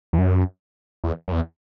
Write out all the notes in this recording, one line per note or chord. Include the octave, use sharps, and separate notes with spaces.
E2
F#2
E2
F#2
E2